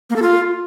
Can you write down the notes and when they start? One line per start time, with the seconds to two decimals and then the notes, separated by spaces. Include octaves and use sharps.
0.10 A#3
0.16 A4
0.22 F4